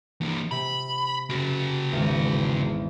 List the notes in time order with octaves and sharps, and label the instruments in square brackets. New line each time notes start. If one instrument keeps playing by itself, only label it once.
[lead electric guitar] E3 A#3
[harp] C3 [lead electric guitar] B5
[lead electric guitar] C#3 F#4
[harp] G#1 E2